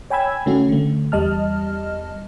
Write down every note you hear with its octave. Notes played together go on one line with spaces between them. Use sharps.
C#5 G5 G#5 B5 E6 G#6
C#3 A3 C#4 F#4
D3 A3
E2 G3 D#5 A5 F6